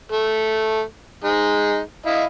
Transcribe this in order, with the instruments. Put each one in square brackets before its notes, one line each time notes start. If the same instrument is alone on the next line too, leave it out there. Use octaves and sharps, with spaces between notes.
[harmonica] A3
G#3 D#4
E4 D#5 F5